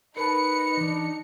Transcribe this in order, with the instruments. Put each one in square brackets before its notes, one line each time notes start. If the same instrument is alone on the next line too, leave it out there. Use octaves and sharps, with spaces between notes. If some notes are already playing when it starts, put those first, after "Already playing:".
[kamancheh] D#4 [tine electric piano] A#4 A5 [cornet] B4 [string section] C#7
[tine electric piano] E3 [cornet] D4